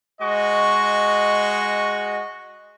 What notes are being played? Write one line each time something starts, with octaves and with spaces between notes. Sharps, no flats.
G#3 F#4 D#5 C#6